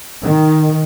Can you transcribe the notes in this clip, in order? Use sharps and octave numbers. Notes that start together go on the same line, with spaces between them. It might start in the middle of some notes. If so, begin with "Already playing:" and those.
D#3